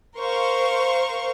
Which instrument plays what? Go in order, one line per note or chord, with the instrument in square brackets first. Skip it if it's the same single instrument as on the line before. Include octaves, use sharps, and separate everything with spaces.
[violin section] A#4 C5 F5 C6 C#6